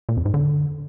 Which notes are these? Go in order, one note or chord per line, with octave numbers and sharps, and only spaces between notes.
A#2
F2
G#2
D3